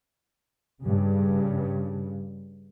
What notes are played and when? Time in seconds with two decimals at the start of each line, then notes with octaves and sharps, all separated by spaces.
0.82 G2 C#3